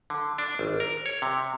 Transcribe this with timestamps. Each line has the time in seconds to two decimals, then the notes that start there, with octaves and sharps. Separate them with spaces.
0.10 D3
0.38 D4
0.59 G#1
0.80 A#4
1.06 C#5
1.22 C3